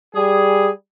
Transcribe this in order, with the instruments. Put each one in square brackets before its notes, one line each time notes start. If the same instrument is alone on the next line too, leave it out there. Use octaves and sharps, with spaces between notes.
[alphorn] G3 [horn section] G#4